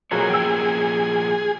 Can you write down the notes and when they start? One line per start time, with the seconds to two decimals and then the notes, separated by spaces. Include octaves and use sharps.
0.11 B2 F#3 A#3 F4 G#4 A4 C#5
0.29 F3 A#3 G4 G5 E6